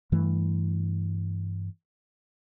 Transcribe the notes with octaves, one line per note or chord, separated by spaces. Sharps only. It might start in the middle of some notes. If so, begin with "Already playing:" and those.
G2 E3 A3